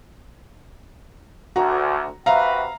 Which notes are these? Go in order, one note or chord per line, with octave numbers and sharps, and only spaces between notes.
D2 F#4 A#5
C3 F#4 B4 E5 F5 A#5